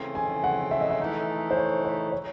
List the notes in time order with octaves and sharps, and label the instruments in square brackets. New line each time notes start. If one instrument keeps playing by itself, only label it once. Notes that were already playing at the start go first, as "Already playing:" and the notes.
Already playing: [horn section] C#3 E3 A3 C4
[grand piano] G#5
F#5
E5
D#5
E5
[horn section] E3 A3 D#4
[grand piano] C5
C#5
C5
C#5